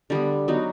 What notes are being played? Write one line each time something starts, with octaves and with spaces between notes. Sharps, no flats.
D3 G3 B3
F#3 B3 D#4 F#4